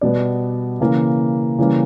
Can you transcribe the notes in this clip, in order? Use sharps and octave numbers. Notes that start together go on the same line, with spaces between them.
B2 G3 B3 D5
C#3 E3 A#3
C#3 E3 G3 A#3